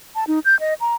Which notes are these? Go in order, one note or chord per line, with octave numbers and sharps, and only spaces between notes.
A5
D#4
G6
D#5
A#5